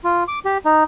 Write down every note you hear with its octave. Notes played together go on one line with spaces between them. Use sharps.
F4
D6
G4
D#4